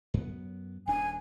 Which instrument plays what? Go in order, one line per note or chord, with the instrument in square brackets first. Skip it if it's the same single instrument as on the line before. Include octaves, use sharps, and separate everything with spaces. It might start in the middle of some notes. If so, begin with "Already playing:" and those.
[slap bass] F#2 B3
[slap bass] D#1 D4 [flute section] G#5